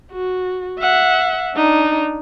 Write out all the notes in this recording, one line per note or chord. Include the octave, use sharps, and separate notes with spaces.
F#4
E5 F#5
D4 D#4